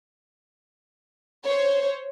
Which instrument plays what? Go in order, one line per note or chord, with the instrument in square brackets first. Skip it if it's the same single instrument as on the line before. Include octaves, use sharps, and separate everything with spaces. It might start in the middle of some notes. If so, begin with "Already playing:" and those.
[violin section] C5 C#5